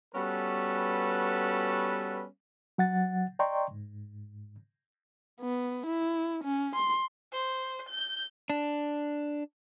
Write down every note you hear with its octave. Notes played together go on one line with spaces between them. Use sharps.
G3 B3 C#4 F#4 A4 B4
F#3 F#5 A6
D5 D#5 G5 A#5 C6 C#6
G#2
B3
E4
C#4
C6
C5
G6
D4